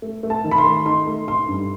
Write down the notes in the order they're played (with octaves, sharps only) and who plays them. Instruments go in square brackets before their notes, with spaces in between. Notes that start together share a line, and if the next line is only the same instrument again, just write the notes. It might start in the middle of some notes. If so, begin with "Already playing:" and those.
[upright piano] A3
A3
A5
D#3
B5
C6
A3
D#4 C6
A3
D#4 C6
G2